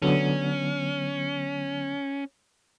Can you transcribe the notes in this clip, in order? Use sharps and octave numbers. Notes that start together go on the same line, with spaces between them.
D3 F#3 B3 C#4